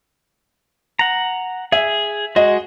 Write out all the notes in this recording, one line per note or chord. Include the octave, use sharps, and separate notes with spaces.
F#5 A#5
G#4 E5
G#3 F#4 D#5